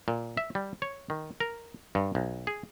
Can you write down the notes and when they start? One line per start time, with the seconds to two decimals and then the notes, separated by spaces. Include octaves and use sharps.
0.08 A#2
0.37 E5
0.55 G3
0.82 C#5
1.10 D#3
1.40 A#4
1.95 G2
2.15 B1
2.47 G#4